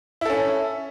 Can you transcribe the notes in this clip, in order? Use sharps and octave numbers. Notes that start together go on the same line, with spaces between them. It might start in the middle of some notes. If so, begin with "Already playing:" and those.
C#4 E4 A4